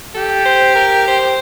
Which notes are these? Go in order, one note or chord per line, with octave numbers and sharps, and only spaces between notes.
G4 A4
C5
A#4
C5